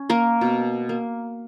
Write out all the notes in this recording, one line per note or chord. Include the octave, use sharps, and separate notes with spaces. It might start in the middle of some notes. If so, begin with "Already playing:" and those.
Already playing: C#4
A#3 A#4
B2
A#3